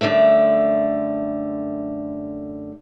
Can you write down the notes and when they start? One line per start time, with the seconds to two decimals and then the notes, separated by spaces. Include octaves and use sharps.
0.01 F#2 D3 G3 A3 E5